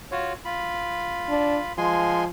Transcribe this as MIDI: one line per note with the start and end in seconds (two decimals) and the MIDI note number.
0.11 0.33 65
0.11 0.33 66
0.11 0.33 73
0.45 1.73 65
0.45 1.73 83
1.28 1.59 62
1.78 2.28 53
1.78 2.24 56
1.78 2.24 80
1.78 2.24 84